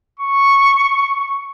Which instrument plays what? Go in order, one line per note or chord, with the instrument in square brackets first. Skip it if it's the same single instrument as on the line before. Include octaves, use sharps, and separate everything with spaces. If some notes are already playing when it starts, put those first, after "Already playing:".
[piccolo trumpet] C#6